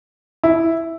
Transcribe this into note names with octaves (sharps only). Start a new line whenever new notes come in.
E4